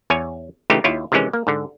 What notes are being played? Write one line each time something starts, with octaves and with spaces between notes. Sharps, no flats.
E2 C#5 G#5
C#3 E3 A3 D#4 F4 G4
D#2 E4 F4 C#5
C3 D#3 E3 G#3 C#4
A#3
G#2 D3